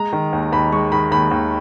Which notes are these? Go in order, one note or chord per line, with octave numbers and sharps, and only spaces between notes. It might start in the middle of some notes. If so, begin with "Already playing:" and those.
Already playing: G#3 A#5
D#3
D#2
D#2 B5
G#3 C#6
D#3 B5
D#2 B5
D#2